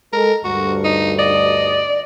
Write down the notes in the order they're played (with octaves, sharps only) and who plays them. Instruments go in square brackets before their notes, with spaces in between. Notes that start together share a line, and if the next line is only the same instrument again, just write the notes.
[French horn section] G#3 A4 [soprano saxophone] A#4
[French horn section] D2 G2 [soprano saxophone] F#4
[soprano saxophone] D#4
[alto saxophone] D5 [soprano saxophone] D#5